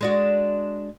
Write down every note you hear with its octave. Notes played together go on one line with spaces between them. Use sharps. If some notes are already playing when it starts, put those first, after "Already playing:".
G#3 D4 F#4